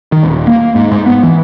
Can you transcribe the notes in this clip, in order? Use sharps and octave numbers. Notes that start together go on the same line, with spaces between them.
D#3
D#1
A#3
G#2
G#2
B3
E3